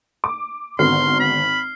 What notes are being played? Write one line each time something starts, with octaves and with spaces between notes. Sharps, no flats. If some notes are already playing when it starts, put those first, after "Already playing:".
D6
G#1 D3 B3 F#4 C6 F6 C7
B5